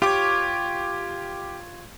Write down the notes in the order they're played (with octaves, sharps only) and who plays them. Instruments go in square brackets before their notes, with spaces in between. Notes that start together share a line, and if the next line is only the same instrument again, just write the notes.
[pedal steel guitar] F4 C#5 [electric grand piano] G4 D6